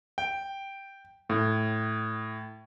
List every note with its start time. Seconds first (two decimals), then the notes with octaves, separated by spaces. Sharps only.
0.18 G5
1.30 A2